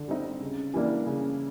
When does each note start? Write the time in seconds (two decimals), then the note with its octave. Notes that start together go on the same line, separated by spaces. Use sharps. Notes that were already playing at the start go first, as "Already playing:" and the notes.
Already playing: D3
0.08 G3 C4 D#4
0.40 C#3
0.74 E3 G3 A#3 D4
1.06 C#3